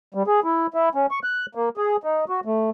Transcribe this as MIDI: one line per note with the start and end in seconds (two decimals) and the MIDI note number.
0.14 0.23 55
0.27 0.40 68
0.44 0.67 64
0.74 0.89 64
0.95 1.06 61
1.11 1.19 85
1.23 1.46 90
1.55 1.69 58
1.77 1.96 68
2.04 2.25 63
2.29 2.40 66
2.45 2.70 57